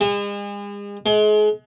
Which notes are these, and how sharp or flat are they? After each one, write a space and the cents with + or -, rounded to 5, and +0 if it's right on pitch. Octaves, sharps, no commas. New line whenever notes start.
G#3 -40
G#3 +35